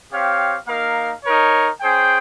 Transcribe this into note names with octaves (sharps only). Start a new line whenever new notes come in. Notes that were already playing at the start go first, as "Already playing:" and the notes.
C4 G4 C#5 F5
A#3 D#4 A#4 F5
D#4 A#4 C#5
C#4 G#4 C5 G5